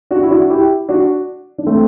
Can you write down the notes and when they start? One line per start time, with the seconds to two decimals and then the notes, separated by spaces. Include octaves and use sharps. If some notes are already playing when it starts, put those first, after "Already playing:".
0.11 D4 F#4
0.23 E4
0.31 D4 F#4
0.50 E4 G4
0.89 D4 F#4
1.58 D4
1.67 A3 C4